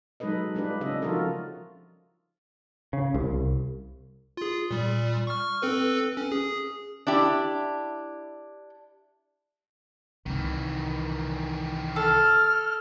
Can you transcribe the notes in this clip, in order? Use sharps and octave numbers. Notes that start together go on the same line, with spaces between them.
F#3 G#3 D#4 A4 B4 D#5
G3 G#3 D4 F4 G4 B4
C#3 C4 C#4 D#5 E5
F3 D#4 F4 F#4 A4 A#4
C#3
C2
F4 G#4
A#2 G3
C#6 F6
C4 A4 B4
C#4
G#4
D4 E4 G4
C2 D#3 E3
A4 F6